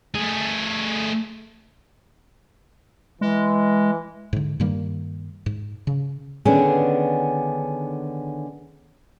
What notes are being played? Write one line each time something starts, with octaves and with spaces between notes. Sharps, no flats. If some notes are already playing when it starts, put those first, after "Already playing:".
A3 G#4
E3 G#3
G#2 D3
G2 D#3 G3 A#3
G#2
C#3
D3 D#3 B3 C#4 D4 G#4